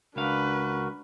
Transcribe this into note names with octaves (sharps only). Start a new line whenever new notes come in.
C#2 D4 F#4 A#4 B4 F5